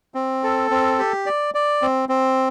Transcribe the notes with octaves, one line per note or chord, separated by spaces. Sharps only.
C4
A4
C4
G4
D5
D5
C4
C4